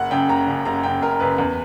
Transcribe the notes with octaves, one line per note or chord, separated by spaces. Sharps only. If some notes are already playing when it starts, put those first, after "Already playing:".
Already playing: F#1 F#5
F#2 C#3 G5
F#1 A#5
F#2 C#3
F#1 A#5
F#2 C#3 G5
F#1 A#4
F#2 C#3 B4
E2